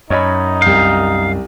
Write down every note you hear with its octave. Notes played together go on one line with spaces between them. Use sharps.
F#2 D#4 C#5 D#5 B5
C2 F5 G6